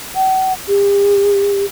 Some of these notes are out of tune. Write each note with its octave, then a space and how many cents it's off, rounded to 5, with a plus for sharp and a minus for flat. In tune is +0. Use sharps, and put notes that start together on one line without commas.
F#5 +40
G4 +40